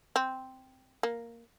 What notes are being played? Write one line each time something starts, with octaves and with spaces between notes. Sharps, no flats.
C4
A#3